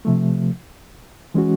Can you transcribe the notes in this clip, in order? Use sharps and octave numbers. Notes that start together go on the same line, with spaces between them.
C3 F3 A3
E3 G#3 C#4 F#4